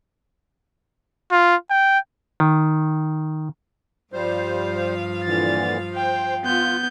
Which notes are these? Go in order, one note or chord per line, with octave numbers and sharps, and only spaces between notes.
F4
G5
D#3
G2 F3 G3 C5 F5
A#2 D3 E3 A6
C5 G5
B3 F4 G6